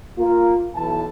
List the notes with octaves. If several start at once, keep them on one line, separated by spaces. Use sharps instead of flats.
A#3 F4
B1 E3 E4 A5